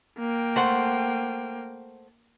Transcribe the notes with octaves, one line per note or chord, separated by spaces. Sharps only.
A#3 G5
A3 C5 F#5